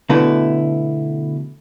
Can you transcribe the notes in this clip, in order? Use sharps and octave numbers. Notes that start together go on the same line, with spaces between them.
B2 D3 A3 E4 B4